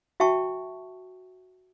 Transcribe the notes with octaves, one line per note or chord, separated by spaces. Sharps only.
F#4 E5 G5 A5 C#6